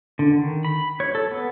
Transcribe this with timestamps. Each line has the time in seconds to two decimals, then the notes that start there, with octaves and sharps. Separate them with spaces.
0.19 D3
0.38 D#3
0.65 B5
1.00 C#5
1.15 A4
1.31 B3